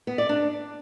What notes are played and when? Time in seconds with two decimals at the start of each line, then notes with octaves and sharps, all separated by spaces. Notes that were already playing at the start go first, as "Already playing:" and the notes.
0.07 B3
0.18 D5
0.29 D4